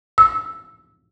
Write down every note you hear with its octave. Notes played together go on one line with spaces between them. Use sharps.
E6